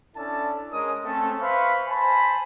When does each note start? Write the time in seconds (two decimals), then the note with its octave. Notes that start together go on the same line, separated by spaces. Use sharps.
0.16 C#4 D4 E4 A4 A5
0.72 G#3 C#4 A#4 D#5 D#6
1.04 A3 C4 C#4 A4
1.40 B4 C5 E5 F5 B5 C#6
1.88 C5 G#5 A5 B5